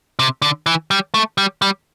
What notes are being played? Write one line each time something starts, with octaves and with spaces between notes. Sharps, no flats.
C3
D3
E3
G3
A3
G3
G3